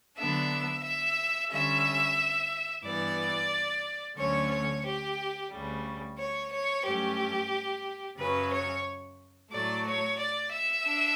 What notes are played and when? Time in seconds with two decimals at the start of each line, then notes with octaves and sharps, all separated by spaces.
0.17 D3 F#3 B3 D4 E5
0.83 E5
1.50 D3 G3 C#4 E5
2.83 G2 E3 B3 D5
4.17 D2 D3 F#3 A3 C#4 C#5
4.50 C#5
4.84 G4
5.50 D2 C#3 G3
6.17 C#5
6.51 C#5
6.84 G2 F#3 A3 C#4 G4
8.18 F#2 C#3 F#3 C#4 B4
8.52 C#5
9.51 A2 F#3 A3 D5
9.85 C#5
10.18 D5
10.51 E5
10.85 D4